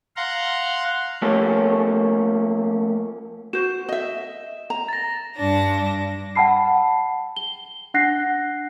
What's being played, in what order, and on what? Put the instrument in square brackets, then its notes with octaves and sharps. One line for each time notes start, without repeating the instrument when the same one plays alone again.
[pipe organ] F5 F#5 A#5 C6
[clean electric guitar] F3 A3 A#3 C#4 G4 A4
[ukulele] F#4 C5 [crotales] E7
[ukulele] D#5 E5
A#5
[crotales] A6 A#6
[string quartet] G2 D4 A#6
[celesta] F#5 G5 A5 B5 C7
G7
D4 F#5 F#6 A#6 C7